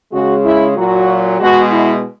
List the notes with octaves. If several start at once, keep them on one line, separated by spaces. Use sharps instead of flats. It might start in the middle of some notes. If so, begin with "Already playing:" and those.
C#3 G#3 F#4
E4
A#2 F#3 F#4
B2 G#3 F#4
E4